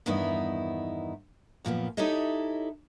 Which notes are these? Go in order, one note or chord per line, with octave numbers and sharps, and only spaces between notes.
E2 G2 D#3 B3 D#4 E4
F#2 A#2 F3 B3
D#4 E4 G4 A4 C#5 D#5